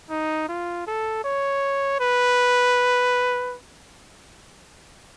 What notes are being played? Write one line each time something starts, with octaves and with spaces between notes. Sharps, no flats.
D#4
F4
A4
C#5
B4